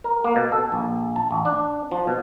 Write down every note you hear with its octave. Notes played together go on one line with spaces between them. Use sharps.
A#4
A#3
B2
A4
A#1
A5
A1
D4
F3
B2